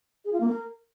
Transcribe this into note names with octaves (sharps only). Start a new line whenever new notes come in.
G#4
F4
A#3
A#4